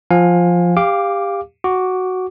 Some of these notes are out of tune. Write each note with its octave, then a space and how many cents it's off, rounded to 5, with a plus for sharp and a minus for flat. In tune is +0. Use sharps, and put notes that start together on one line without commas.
F3 +0 F5 +25 G#5 -15
G4 +25 F5 +0 D6 +0
F#4 +0 D6 -10